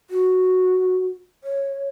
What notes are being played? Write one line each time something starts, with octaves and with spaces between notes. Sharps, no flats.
F#4
C#5